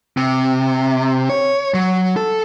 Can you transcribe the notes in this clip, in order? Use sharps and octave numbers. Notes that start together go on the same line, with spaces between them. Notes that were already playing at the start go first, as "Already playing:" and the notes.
C3
C#5
F#3
A4